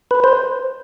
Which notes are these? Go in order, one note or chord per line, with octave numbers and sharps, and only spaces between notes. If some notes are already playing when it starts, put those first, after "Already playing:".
B4
C5